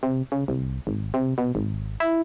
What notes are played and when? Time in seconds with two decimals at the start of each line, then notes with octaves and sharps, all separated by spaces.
0.03 C3
0.32 C#3
0.48 C2
0.87 G#1
1.14 C3
1.38 B2
1.55 G#1
2.00 E4